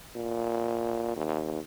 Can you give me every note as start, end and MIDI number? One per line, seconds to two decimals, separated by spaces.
0.16 1.13 46
1.16 1.60 39